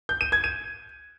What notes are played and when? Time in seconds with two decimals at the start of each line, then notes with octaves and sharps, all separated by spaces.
0.09 G6
0.21 D#7
0.32 G#6
0.44 D#7